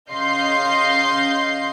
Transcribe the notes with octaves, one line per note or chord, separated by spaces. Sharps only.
C#3 D#5 F5 C6 G6 C7